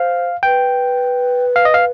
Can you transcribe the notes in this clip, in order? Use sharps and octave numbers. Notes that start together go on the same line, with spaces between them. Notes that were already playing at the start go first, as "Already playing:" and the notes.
Already playing: C5 F5
B4 G5
F5
D#5
F5